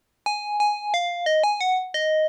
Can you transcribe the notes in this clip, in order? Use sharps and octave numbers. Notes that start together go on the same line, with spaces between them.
G#5
G#5
F5
D#5
G#5
F#5
D#5